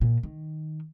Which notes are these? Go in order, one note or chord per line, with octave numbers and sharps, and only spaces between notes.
A#2
D#3